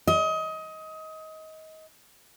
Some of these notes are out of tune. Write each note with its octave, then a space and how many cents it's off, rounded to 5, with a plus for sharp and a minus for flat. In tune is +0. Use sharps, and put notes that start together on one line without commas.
D#5 +25